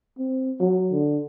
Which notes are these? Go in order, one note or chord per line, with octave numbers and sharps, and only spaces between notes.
C4
F#3
D3